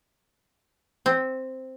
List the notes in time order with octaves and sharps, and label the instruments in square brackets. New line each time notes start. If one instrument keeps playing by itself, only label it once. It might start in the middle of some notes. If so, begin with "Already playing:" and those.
[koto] C4